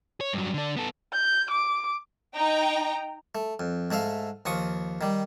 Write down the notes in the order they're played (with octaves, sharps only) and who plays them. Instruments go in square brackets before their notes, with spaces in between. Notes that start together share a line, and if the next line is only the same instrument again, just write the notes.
[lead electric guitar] C#5
G2 F#3
D3 D4
B3 A4
[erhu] G6
D6
[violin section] D#4 G5 A#5
[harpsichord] A3
F2
G#2 A3 E5 F5
D#2 F3 C#6 D#6
D#3 G3